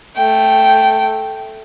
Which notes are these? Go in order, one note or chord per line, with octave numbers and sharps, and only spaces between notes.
A3 G5